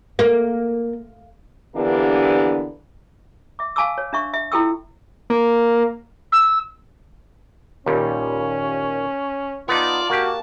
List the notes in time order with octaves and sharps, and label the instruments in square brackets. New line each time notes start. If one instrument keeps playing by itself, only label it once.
[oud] A#3
[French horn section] D3 E3 A#3 B3 D4 G4
[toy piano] E5 D6
F5 G#5 A5 C#6 D6 E6
C#5
D4 E5 C#6
E5
E4 F4 A4 G5 C#6 E6
[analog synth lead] A#3
[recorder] E6
[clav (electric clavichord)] D#2 A#2 G3 [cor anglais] C#4
[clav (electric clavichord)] B3 D#4 [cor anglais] F4 [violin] D5 A5
[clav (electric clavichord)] A#3 G4 [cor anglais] F#4 [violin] A5